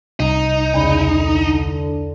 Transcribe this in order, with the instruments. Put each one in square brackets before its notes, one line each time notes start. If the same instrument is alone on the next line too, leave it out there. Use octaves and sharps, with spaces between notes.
[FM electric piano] C2 [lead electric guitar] D#4
[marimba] E2 D5 B5 [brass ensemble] C#3 G#3
[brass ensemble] D3